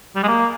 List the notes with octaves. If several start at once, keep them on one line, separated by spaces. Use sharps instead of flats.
G3
G#3
A#3